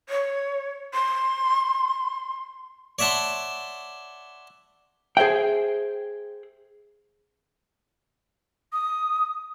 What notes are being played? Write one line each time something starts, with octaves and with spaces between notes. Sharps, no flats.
C#5
C6
C#5 D5 E5 F#5 A5 C6
G#4 C5 D5 E5 G5
D#6